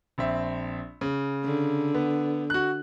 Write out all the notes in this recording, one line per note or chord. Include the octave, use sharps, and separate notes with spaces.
A#1 C4 E5
C#3
D3
B3
F#4 F#6